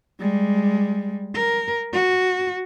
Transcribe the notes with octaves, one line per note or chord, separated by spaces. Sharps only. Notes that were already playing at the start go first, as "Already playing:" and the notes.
G3 G#3
A#4
F#4